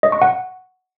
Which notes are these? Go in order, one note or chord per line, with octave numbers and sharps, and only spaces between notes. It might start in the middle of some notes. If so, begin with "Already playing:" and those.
D#5
C#6
F#5